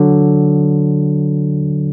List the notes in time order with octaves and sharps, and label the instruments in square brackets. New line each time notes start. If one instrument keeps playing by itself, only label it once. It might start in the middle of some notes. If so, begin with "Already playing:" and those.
Already playing: [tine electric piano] D3 F#3